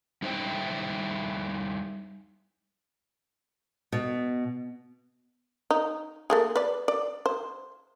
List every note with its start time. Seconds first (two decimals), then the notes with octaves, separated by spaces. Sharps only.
0.22 G3 D#4 E4 C5 E5 G5
3.92 B2
5.71 D#4
6.30 A3 A#3 G#4
6.56 B4 D5
6.88 D5
7.26 C5